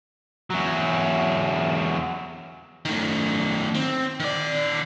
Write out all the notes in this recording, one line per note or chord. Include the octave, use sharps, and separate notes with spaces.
E2 F#3
D#3 A3
C4
D#3 D5